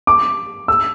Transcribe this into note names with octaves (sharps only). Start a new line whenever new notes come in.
D6
E6